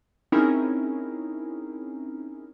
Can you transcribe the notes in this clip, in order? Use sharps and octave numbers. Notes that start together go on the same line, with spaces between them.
C4 C#4 D#4 E4 G#4 A#4